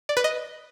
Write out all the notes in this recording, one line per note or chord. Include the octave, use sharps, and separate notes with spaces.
D5
B4
D#5